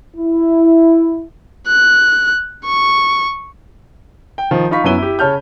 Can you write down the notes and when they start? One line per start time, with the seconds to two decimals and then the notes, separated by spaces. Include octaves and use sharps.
0.17 E4
1.67 F#6
2.66 C#6
4.38 G5
4.51 D#3 F3
4.71 D#4 F4 B5 C#6 B6
4.84 F#2 B3 C#4 E4 D#7 G7
4.98 E4 G4
5.19 C#3 C#5 A5 F6 G6